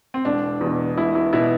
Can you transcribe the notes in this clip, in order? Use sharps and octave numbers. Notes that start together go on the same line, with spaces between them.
C4
E1 D4
E2 B2
E1 E4
E4
B2 E4